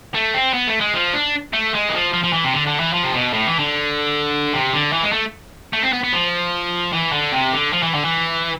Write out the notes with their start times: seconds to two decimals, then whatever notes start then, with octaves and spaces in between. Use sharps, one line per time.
0.14 A3
0.34 C4
0.53 B3
0.67 A3
0.81 G#3
0.94 F3
1.14 D4
1.53 A3
1.74 G#3
1.89 E3
1.93 F3
2.13 F3
2.24 F3
2.33 E3
2.44 C3
2.54 D3
2.67 D3
2.80 E3
2.94 F3
3.04 C3
3.14 B2
3.34 A2
3.47 E3
3.59 D3
4.53 C3
4.73 D3
4.93 E3
5.03 G#3
5.13 A3
5.73 A3
5.82 C4
5.93 B3
6.04 B3
6.13 F3
6.93 E3
7.13 D3
7.32 C3
7.53 D3
7.73 F3
7.83 E3
7.94 D3
8.05 E3